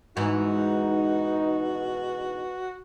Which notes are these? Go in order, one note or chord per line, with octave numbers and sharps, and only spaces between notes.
G#2 B2 E3 D#4 F#4